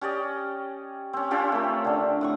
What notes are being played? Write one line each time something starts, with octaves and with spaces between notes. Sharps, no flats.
C#4 G4 D5 D#5
C4 C#4
C4 C#4 F4 G4
A3 A#4
D3 D4
A2 F#5 C#6